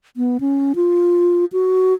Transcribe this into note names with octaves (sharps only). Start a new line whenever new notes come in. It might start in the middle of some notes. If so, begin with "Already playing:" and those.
B3
C#4
F4
F#4